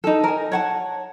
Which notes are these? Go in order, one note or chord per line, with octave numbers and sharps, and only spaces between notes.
D#4 A4
A#4 G#5
C#5 F#5 A5